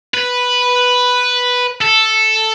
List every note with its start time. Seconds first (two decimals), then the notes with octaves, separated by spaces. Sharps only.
0.14 B4
1.82 A4